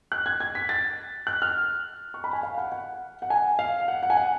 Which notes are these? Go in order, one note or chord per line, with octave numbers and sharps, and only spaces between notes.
F#6
G#6
G#6
B6
A6
F#6
F6
C#6
B5
G#5
F5
F#5
F#5
F#5
G#5
F5
F#5
F#5
G#5
F#5